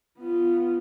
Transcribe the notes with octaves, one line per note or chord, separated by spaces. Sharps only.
B3 F4